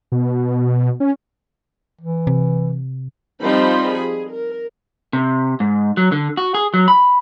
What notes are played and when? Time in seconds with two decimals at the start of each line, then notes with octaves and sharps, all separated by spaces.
0.12 B2
1.00 C#4
2.01 E3
2.27 C3
3.42 F3 G3 C4 D#4 C5 B5
3.92 G#4
4.32 A#4
5.13 C3
5.60 G#2
5.97 F#3
6.12 D3
6.37 F#4
6.54 G#4
6.74 F#3
6.88 B5